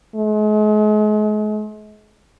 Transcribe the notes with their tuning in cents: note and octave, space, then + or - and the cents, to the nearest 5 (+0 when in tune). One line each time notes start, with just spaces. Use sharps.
G#3 +40